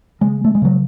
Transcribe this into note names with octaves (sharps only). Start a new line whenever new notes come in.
C#3 G#3
A3
G#3
C#3 F#3